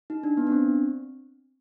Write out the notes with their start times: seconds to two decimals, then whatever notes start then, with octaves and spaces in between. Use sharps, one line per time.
0.10 D#4
0.23 D4
0.37 B3
0.47 D4
0.52 C4